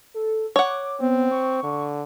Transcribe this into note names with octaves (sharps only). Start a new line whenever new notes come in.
A4
C#5 F#5 D6
B3 C4
C#6
D3